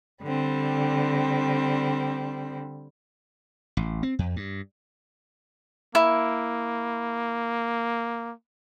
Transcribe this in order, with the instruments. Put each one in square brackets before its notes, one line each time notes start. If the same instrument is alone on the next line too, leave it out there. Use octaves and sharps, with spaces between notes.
[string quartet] D3 G3 C4
[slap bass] A1
C4
F2
G2
[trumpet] A#3 [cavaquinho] E4